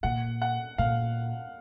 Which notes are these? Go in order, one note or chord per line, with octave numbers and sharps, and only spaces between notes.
A#2 F#5
F#5
A#2 F5